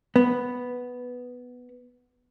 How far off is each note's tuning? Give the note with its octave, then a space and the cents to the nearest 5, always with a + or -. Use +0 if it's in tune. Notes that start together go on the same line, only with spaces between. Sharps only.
B3 +0